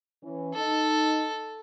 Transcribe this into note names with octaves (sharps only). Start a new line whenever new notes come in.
E3 C#4
D#4 A4